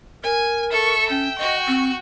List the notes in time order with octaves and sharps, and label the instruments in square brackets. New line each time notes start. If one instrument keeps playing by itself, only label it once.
[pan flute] A#4 [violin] G#5
[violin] A4 C#6 [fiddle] E5
[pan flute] C#4 [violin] G5
[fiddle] F#4 C#6 [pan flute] D#5
[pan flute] C4